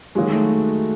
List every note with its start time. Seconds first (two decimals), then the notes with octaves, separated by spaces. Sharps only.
0.15 D#3 F#3 G#3 A#3 D#4 F#4
0.33 A3